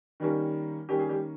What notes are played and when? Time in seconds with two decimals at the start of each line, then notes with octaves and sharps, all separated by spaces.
0.20 D#3 G3 A#3 C#4
0.89 D#3 G3 A#3 C#4 G4
0.99 G#4
1.09 G3 G4